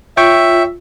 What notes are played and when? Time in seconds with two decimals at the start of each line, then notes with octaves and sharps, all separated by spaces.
0.17 F4 C#5 E5 G5 C#6